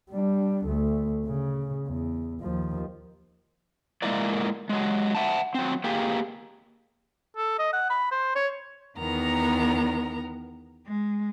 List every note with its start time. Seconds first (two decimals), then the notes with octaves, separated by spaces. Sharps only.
0.11 G3 D4
0.65 D2 A3
1.26 C#3
1.87 E2
2.42 D#2 F3
4.02 G#3 A#3 E4 F4 A#4 D5
4.69 F#3 G#3
5.15 E5 F#5 A5
5.55 F#3 C4
5.84 A#3 G4 G#4
7.37 A4
7.59 D#5
7.73 F#5
7.90 B5
8.11 C5
8.35 C#5
8.99 E2 D#3 B3 A#4 A#5
10.87 G#3